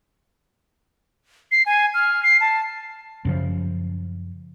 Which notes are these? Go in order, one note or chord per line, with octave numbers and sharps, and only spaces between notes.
C7
G#5
F6
C7
A5
F#2 C#3 F3